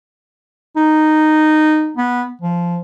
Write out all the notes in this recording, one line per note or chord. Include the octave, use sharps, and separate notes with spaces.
D#4
B3
F3